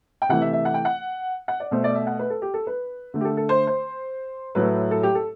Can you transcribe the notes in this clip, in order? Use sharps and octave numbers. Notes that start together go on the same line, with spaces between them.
G5
C3 E3 A3 F#5
E5
E5
F#5
G5
F#5
F#5
D5
B2 A3 C5
D5
E5
F#5
B4
A4
G4
A4
B4
D3 A3
G4
A4
A4
C5
C5
A2 F#3 A3 B4
A4
G4
A4